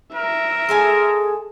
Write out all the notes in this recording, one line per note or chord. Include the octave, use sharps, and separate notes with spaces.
A#4 E5
G#3 G#4 A4 G#5